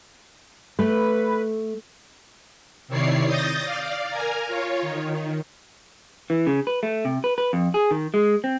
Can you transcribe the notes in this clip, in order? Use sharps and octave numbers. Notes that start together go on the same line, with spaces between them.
A3 B4
C3 D#3 E4 C#5 D5 C7
D#6 G6 A6 A#6
D5 F5
A#4 G#5 A#5
F4 C#5
D#3
E3
C#3
B4
A3
C3
B4
B4
F2
G#4
D#3
G#3
C4